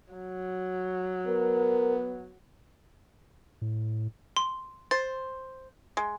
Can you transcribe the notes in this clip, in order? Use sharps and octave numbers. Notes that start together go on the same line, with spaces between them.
F#3
B3 A#4
A2
C6
C5 A6
G#3